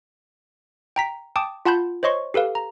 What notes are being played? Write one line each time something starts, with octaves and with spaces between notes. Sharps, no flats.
G5 A#5 B6
G5 A5 D6 D#6
F4 F#5 A5 B5 C6 G6
C5 C#5 D#5 C6 C#6
G4 A4 B4 F5
A#5